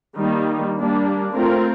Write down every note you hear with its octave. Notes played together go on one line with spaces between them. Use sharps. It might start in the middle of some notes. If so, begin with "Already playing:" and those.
D#3 G3 A#3 D#4
G3 A#3 D4
A3 C4 F4 A#4